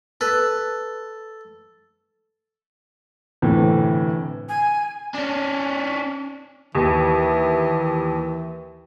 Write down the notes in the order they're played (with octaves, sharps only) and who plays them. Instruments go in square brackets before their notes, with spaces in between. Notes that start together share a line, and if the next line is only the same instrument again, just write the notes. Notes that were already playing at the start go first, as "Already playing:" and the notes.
[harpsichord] A4 [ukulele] B4
[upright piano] G1 A2 C3 E3
[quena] G#5
[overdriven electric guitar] C#4 D4
[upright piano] D#2 [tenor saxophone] E3